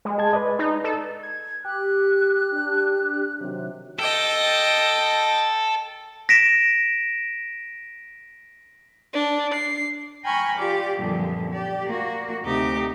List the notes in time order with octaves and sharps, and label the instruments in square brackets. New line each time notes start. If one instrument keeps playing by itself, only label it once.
[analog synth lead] G#3
[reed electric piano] G#4 A5 G#6
B4 D5 D#5
[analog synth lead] D#4
A4
G#6
[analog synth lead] G4 [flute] F#6
[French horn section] D4
C3 D#3 F#3
[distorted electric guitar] A4 [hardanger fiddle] D#5 G5
[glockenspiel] A#6 B6 D7 E7
[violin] D4
C7
[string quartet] G5 G#5 A#5 B5 C#6 F6
F4 G4 D5 D6
F#2 A#2 D3 F3 G3 B3
G4 D5
A#3 F#4
D2 C3 D#4 G4 D6